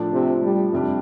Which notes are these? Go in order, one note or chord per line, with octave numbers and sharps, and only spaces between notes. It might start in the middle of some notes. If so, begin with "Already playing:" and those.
Already playing: A2 F3 A3 D4
C3
G3
F2 C3 G3 D4